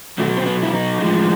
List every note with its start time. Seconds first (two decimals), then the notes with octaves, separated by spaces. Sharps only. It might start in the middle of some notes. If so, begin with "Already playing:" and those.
0.18 B2 F#3 A3
0.37 C4
0.46 B3
0.62 E4
0.74 D#4
1.00 A2 F3 G#3